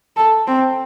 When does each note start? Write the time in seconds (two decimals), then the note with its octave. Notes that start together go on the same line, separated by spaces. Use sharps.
0.16 A4
0.47 C4